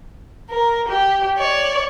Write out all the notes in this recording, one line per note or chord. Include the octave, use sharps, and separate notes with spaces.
A#4
G4
C#5 D5